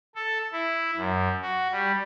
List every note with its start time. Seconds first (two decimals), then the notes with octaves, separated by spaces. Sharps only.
0.15 A4
0.52 E4
0.96 F#2
1.42 F#4
1.71 G3